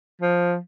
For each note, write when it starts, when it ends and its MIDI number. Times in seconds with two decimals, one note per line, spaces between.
0.21 0.57 53